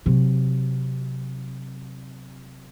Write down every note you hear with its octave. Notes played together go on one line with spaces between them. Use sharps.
C3 F#3